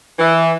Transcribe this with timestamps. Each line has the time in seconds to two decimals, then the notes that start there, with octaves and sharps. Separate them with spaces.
0.19 E3